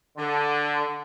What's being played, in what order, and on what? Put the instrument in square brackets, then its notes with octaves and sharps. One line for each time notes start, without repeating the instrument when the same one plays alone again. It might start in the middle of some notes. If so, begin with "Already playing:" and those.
[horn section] D3